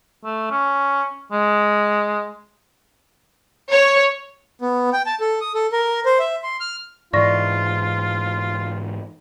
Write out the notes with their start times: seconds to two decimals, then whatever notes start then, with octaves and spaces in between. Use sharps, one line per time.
0.25 A3
0.51 C#4
1.32 G#3
3.69 C#5
4.61 B3
4.93 G5
5.06 A5
5.20 A4
5.41 D#6
5.55 A4
5.73 A#4
6.06 C5
6.19 E5
6.43 C6
6.60 F6
7.13 G#2 E3 F4 D5 C#6 A#6